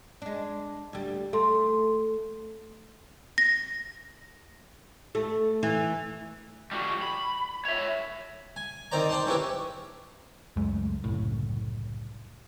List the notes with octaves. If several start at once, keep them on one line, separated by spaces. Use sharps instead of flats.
G#3 D4
D2 G3
A3 A4 C6
A#6
A3
E3
G3 F#4
B5
C#5 E5
G#5
D#3 C4 C5 D5 A#5
D5 G5 A5 C6
C4 C#4 E4 G4 B4
C#2 F#2 G#3 A3
F#1 C2 A2